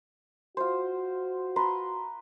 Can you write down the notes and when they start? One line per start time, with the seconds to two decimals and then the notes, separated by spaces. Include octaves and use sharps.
0.57 F4 F#4 C5
1.56 B4 A#5 C6